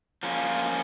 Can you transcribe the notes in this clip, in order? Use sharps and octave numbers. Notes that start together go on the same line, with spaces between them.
F3 A#3 C#4 F4